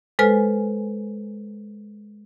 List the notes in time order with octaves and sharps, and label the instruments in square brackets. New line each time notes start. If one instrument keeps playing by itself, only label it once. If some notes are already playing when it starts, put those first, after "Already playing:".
[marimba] G#3 A4 B4 C5 G#5 F6